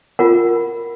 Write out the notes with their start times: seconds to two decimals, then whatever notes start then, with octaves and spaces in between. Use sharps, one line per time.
0.19 F4 A#4 F#5